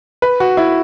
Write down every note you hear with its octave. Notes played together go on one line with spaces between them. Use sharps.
B4
F#4
E4